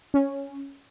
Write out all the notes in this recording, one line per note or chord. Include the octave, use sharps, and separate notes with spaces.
C#4